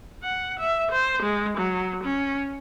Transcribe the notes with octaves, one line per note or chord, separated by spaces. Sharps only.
F#5
E5
C5
G#3
F#3
C#4